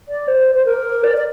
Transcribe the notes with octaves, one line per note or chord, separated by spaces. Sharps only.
D5
C5
C5
A#4
D5
D5